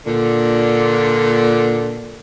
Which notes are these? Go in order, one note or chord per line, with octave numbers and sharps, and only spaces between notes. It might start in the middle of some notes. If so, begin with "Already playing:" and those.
A#2 D3